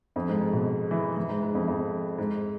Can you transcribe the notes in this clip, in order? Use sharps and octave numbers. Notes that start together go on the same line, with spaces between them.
F2
G#2
G#2
B2
E3
E3
G#2
G#2
F2
F2
G#2